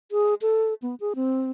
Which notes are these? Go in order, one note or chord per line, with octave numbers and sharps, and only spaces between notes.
G#4
A4
B3
G#4
C4